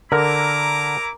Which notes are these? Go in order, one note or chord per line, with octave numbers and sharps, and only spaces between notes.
D3 E4 A#4 A#5 D6